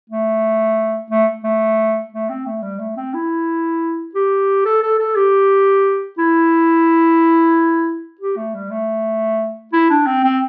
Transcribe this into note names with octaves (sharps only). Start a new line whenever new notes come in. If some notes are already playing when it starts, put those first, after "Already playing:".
A3
A3
A3
A3
C4
A3
G3
A3
C4
E4
G4
A4
A4
A4
G4
E4
G4
A3
G3
A3
E4
D4
C4
C4